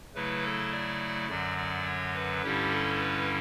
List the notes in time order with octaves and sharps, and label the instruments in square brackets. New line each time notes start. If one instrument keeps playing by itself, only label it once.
[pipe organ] C#3 F#3 A3 E4 B4
A4
D5
F#2 D3 F#3 D5
D5
C#5
B4
G2 D3 G3 C#4 E4 G4
A4
B4